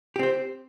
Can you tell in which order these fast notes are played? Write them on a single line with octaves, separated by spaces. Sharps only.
G4 C4 C5